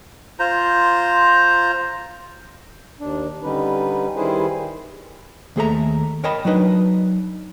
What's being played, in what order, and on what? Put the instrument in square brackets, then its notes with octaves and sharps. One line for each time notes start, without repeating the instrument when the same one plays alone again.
[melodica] F4 C5 A#5
[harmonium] D#2 D4
D3 G3 C#4 D#4 B4
D#3 G3 E4 G#4 B4 C5
[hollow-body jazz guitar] D#2 A3 G#4 A4 E5 A#5
A#4 C#5 D#5 G5 A5 B5
F#3 D4 D#4 B4 D#5